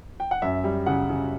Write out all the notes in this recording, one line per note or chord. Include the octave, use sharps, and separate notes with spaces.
G5
F#5
F#2 E5
G3
C#3 F#5
C#3